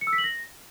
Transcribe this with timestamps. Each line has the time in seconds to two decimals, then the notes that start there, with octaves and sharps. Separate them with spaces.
0.01 C#7
0.07 E6
0.13 B6
0.18 F#7
0.24 A#6